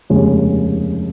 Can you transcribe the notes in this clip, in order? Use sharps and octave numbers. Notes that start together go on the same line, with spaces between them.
F1 D#2 C#3 G#3